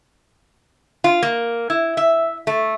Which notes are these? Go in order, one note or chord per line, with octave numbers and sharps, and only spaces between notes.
F4
A#3
E4
E5
A3